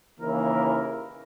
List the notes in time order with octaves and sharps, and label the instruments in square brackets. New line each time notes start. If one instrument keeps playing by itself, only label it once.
[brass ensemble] D#2 C#3 E3 A#3 E4 A#4